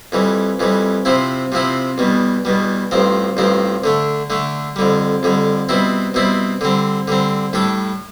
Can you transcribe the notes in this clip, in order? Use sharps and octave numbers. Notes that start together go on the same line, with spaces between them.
F2 E3 G3
F2 E3 G3
C3 F3 C4 E4
C3 F3 C4 E4
E2 B2 G3
E2 B2 G3
A1 G2 F3 C4
A1 G2 F3 C4
D3 A3 D4
D3 A3 D4
F2 D3 G3
F2 D3 G3
B2 G3 C4 E4
B2 G3 C4 E4
D3 G3 C4
D3 G3 C4
A2 G3 D4 A4